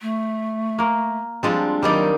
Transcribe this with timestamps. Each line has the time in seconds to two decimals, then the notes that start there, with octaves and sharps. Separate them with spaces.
0.02 A3
0.78 A#3 A#4
1.43 F3 G3 G#3 C4 D4 F4
1.83 D#3 F#3 G3 A#3 D#4 D5